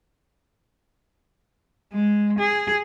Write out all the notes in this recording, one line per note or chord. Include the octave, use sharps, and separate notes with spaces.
G#3
G#4